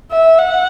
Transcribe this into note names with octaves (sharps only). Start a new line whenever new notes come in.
E5
F#5